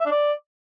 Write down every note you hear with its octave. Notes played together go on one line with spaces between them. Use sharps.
E5
D4
D5